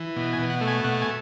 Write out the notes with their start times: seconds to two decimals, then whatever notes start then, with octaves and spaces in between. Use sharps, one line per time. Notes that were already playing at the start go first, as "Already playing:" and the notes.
Already playing: E3
0.16 B2
0.33 G#5
0.39 B2
0.50 F#5
0.61 A3
0.68 G#5
0.84 B2 F#5
1.02 G#5